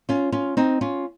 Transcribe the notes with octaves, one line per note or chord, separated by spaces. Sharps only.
C#4 F4
C#4 F4
C4 D#4
C#4 F4